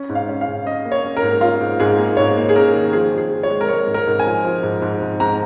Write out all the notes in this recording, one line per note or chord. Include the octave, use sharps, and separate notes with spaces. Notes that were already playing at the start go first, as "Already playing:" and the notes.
Already playing: C#4
G#2
F5
C#4
F5
G#2
C#4 D#5
A#3
C#5
C#4
A#4
G#2
C#4 F4
G#2
G#2 G#4
A#3
G#2 C#5
A#3
G#4
C#4 A#4
D#3
F3 G#4
F3
G#4
F3
C#5
G#3
A#4
G#3 C#5
G#2
A#4
G#2
G#5
F3
F3
G#2
G#2
G#2
G#2 A#5